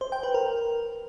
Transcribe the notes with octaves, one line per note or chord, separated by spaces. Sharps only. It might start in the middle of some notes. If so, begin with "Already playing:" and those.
C5
G5
B4
A#4